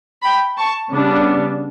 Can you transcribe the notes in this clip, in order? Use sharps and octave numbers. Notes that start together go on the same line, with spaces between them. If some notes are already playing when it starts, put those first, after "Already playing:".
G5 B5
A5 C#6
C#3 G3 B3 D4